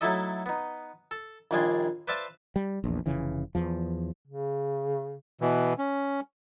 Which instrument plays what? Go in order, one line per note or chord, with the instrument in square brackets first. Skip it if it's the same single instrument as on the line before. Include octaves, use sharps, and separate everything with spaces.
[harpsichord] F#3 A3 D#4 E4 A4 D#5
B3 D#4
A4
A#1 D#2 G3 D4 G#4 C6
B4 C5 D5 E5 F5 A5
[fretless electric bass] G3
A#1 E2
F1 C#3 E3
E2 F3
[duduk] C#3
[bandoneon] B2 E3
C#4